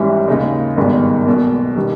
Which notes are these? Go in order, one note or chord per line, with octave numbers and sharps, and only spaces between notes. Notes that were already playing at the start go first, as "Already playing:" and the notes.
Already playing: G#1 G#2 E3 G3 C#4
D#2 C#3 G#3 D#4
G#1 G2 D#3 G#3 B3
B1 B2 A#3
D#3 G3